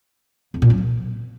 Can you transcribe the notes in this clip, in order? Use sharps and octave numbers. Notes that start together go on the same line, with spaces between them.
F2
A#2
F#2
F3